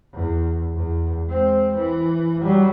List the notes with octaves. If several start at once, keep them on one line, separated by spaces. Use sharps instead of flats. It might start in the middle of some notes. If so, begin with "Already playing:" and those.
E2
E2
G#3 C4
E3
F#3 G3